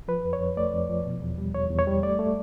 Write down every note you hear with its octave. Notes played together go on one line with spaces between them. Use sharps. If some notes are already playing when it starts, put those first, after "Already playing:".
F3 B4
F2
C#5
F2
A3 D5
F2
F3
B2
E2
G3
E2 C#5
E2
C#5
G3
A3 D5
A3